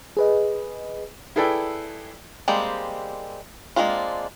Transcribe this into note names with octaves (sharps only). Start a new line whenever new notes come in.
G#4 B4 D#5
E4 G#4 A4 B4 D5 G5
G3 G#3 A#3 C4 G4
G#3 A#3 C4 D4 F4